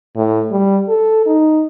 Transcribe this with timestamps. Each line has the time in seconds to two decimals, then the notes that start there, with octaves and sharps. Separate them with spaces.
0.16 A2
0.51 G3
0.88 A4
1.26 D#4